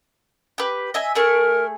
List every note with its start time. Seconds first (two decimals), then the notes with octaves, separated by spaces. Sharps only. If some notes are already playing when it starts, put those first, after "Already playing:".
0.58 G4 B4
0.94 D#5 E5 G#5
1.15 A3 G#4 A#4 C#6